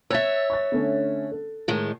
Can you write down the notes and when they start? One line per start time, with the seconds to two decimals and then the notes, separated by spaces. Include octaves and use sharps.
0.10 C#5 E5 E6 F#6 A6
0.50 C#6 A6
0.72 D3 A3 C#4
1.31 A4
1.68 A2 D#3 G#3